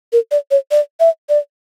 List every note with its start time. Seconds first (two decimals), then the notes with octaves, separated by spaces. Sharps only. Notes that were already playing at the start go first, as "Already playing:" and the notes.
0.13 A#4
0.31 D5
0.51 C#5
0.71 D5
1.00 E5
1.29 D5